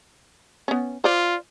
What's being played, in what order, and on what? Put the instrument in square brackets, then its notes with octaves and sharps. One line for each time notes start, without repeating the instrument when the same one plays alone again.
[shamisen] B3 C#4
[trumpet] F4 [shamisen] C5 D5